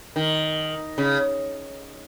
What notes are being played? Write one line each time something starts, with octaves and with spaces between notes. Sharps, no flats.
D#3
C#3